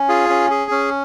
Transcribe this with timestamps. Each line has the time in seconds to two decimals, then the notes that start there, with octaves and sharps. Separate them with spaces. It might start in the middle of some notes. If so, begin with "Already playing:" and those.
Already playing: C#4
0.09 F4 G#4
0.29 C#4
0.50 G#4
0.71 C#4